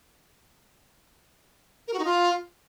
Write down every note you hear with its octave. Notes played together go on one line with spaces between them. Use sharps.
A#4
F#4
D#4
F4